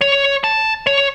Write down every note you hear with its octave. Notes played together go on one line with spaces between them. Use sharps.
C#5
A5
C#5